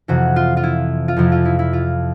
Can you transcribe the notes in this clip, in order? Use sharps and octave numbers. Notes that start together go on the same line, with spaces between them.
F2 C3 E3 F#4
F4
F4
E4
F4
F2 C3 F3 E4
F4
E4
E4
F4